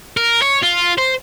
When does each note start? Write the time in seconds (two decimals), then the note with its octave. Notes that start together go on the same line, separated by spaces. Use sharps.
0.17 A#4
0.42 C#5
0.63 F4
0.98 C5